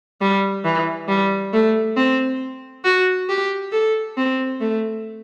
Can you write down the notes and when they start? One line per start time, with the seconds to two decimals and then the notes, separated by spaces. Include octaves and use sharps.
0.21 G3
0.64 E3
1.08 G3
1.53 A3
1.97 C4
2.85 F#4
3.29 G4
3.72 A4
4.17 C4
4.61 A3